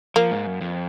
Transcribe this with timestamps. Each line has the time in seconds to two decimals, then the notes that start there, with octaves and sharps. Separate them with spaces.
0.16 F3 A#3
0.31 G#2
0.47 F#2
0.61 F2